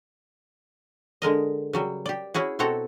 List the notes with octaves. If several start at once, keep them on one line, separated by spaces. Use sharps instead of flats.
D3 G#3 A#4 D#5
C#3 F#3 G3
G4 D5
C#4 E4 F#4 G#4
B2 C4 F#4 A4 A#5